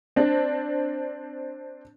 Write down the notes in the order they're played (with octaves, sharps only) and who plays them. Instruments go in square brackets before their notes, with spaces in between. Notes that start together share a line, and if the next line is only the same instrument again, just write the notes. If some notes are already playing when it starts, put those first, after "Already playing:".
[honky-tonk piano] C4 D4